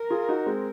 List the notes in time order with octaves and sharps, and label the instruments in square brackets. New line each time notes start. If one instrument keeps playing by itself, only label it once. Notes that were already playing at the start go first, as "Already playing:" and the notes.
Already playing: [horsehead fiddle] A#4
[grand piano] F4 G#4
D#4 F#4
G#3 C4